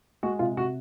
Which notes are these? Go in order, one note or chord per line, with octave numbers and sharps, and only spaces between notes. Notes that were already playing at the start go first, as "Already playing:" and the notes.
G#3 F#4
C3 F4
C3 F#4